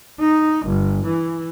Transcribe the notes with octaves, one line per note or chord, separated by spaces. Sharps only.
D#4
G1
E3